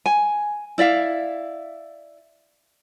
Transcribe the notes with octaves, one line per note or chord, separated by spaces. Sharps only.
G#5
E4 D5 E5 F5